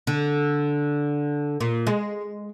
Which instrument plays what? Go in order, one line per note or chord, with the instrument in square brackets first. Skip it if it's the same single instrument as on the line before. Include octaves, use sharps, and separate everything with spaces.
[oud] D3
A#2
G#3